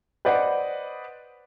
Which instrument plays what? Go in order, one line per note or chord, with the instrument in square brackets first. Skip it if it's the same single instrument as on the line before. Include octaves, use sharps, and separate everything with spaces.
[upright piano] B4 C5 D5 D#5 F#5